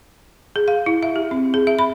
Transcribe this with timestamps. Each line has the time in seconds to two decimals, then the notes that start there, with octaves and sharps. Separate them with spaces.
0.56 G#4
0.68 F5
0.86 E4
1.03 E5
1.16 G4
1.31 C4
1.54 G#4
1.67 E5
1.79 B5